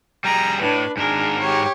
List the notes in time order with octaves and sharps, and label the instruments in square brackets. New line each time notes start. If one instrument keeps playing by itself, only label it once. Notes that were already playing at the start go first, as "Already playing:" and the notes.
[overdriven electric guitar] G3 G#4 [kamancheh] A#5
[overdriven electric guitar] A2 [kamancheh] D4 B4
[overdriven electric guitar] G#2 A#4 [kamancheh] D4 G#4
[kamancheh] G4 C#5